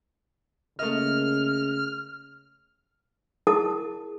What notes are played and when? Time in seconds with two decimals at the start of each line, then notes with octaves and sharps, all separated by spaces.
0.79 C#3 A3 A#3 D#5 F6
3.47 E4 G#4 A#4 A5 D#6